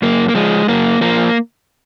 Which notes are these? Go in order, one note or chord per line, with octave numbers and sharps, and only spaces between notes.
F#2 A#3
A#3
F3 G#3
F#2 A#3
F3 A#3